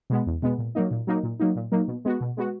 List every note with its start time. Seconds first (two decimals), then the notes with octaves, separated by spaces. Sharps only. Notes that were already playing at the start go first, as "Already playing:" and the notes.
0.10 B2 G#3 B3
0.26 E2
0.42 B2 G#3 B3
0.58 A#2
0.75 F#3 A#3 D#4
0.91 A#2
1.07 F#3 A#3 D#4
1.23 A#2
1.40 F#3 A#3 D#4
1.56 A#2
1.72 F#3 A#3 D#4
1.88 B2
2.05 G#3 B3 F#4
2.21 B2
2.37 G#3 B3 F#4